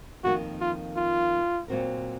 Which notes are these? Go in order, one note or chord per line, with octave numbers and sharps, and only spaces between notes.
F2 D#3 A#3 F#4
F4
F4
A#2 F#3 C4 F#4 A#4